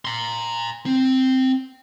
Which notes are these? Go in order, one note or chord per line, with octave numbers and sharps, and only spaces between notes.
A#5 C6
C4